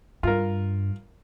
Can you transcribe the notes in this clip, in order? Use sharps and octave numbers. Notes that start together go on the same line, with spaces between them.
G2 F4 A#4